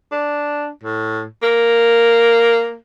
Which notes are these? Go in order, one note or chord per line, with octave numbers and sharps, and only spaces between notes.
D4
A2
A#3